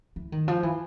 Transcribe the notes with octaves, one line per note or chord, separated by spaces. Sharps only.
E3
D#3
F3
E3